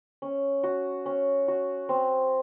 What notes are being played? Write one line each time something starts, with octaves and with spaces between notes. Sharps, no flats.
C#4
F#4
C#4
F#4
C4